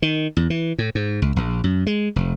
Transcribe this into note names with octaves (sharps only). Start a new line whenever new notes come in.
D#3
E2
E3
A2
G#2
C#2
A#1
F#2
G#3
F1